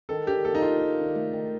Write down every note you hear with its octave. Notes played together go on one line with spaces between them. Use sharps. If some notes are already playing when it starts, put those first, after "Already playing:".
D#3 A4
D4 G4
A#3 A4
D#4
D#3 F4
D#3
D4
A3
D#3